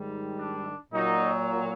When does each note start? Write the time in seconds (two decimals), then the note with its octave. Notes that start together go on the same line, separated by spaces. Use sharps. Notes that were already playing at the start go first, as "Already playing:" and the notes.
Already playing: G#2 D#3 G3
0.39 D4
0.93 A#2 F#3 D#4